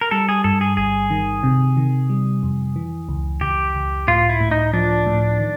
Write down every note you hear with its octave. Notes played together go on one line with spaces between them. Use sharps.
A#4
G3 A4
G#4
G2 A4
G#4
G1 G#4
D#3
C3
D#3
G3
F2
E3
C#2
C#2 G4
C#2
A2 F4
E4
A2
D#4
F3 D4
A2
D#3